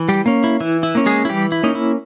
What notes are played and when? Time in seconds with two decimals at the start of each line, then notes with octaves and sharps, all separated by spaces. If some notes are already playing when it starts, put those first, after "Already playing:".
Already playing: E3
0.09 G3 G4
0.26 A#3 C#4
0.44 E4
0.61 E3 E4
0.83 E4
0.95 A#3 C#4
1.06 G#3 G#4
1.25 E4
1.29 E3 G3 G4
1.52 E4
1.64 A#3 C#4 D#4
1.75 E4